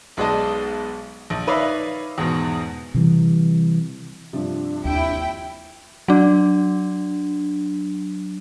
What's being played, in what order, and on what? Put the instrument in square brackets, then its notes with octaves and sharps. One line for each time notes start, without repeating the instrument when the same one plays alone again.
[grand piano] B1 G#3 B3 D5 D#5 A5
A#1
D#4 B4 C#5 D5 E5 F5
E2 G#2 B2
[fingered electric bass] C3 E3 G3
[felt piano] G2 C3 F3 [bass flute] D4
[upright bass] D#2 [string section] E4 G5
[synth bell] F#3 D4